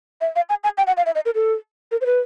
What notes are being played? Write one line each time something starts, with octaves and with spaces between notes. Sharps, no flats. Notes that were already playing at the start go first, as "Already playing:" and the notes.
E5
F5
G#5
G#5
G5
F#5
F5
E5
D#5
A#4
A4
A#4
C5
B4